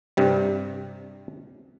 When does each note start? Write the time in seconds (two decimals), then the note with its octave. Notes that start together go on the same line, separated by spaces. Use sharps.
0.17 G2 C3 G3